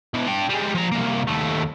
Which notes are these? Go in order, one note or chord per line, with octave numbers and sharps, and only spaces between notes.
B2 E3
D4 G5
G3 G#3
F3 A#5
C2 A#3
D#2 A3